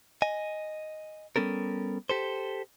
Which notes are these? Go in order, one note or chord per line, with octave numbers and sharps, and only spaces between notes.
D#5 G#5
G3 B3 C#4 A4 A#4
G4 A4 C5